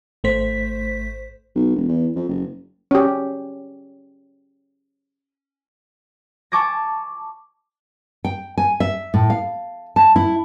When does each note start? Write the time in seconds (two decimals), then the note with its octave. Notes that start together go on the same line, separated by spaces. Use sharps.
0.24 G#1 A3 C5 B6
1.56 B1
1.76 E1
1.88 E2
2.15 F2
2.29 F#1
2.91 C#4 G4
6.52 A5 C#6 D6 G#6 A#6
8.25 G5
8.58 G#5
8.80 E5
9.14 A2
9.30 F5
9.96 A5
10.16 E4